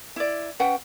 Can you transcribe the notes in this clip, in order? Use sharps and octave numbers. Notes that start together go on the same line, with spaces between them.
E4 D5
C#4 B4 F#5 G5